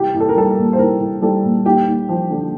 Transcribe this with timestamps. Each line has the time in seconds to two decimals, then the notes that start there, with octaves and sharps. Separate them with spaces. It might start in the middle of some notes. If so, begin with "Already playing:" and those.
Already playing: C2 G4
0.14 C2
0.20 A4
0.29 A#4
0.35 G3 A4
0.50 A#4
0.57 A#2
0.73 C5
0.79 C2 A#4
1.00 C2
1.22 G3 A4
1.43 A#2
1.65 D#2 G4
1.87 D#2
2.09 F3
2.31 D3